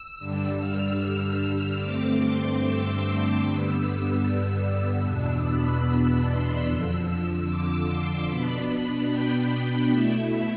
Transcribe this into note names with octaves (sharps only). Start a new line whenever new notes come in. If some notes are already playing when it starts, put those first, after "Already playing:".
Already playing: E6
G2 D3 G3
F6
G2 D3 A3 C4 D6
C6
E6
E6
G2 D3 G3 B3 E6
E6
E6
E2 B2 B3 D4
B5
C6
F2 D3 F3 E6
D6
C6
B2 B3 D4 B5
G5
B2 A3 E4 E5